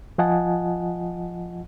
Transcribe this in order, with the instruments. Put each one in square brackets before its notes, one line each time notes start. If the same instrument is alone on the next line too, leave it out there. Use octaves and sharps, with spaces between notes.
[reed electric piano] F3 F4 D#5 F#5 G#5 A5